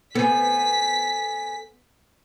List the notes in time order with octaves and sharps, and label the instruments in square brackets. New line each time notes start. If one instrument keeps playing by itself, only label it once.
[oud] B3 [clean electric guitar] A4 C5 G#5 [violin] B6